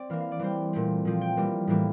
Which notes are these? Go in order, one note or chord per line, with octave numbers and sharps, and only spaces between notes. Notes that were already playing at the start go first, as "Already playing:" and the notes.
Already playing: C4 D5
E3 A#3 F5
F5
D5
E3 G3 C4 C5
A#2 A3 C4
A#2 F3 C4
G5
E3 G3 A#3
A2 E3 G3 A#3